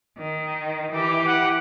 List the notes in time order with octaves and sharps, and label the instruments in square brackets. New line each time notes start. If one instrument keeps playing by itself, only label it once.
[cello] D#3
E3 G4
[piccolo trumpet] F#5